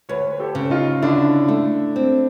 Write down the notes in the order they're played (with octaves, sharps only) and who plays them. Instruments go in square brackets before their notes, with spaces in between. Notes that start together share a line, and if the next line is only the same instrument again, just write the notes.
[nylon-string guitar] D2 [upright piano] B4 C#5
[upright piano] G4 A4
[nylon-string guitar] C#3
[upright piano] D#4 F4
[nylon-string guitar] D3 [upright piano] D4 E4
[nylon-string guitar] A3
C4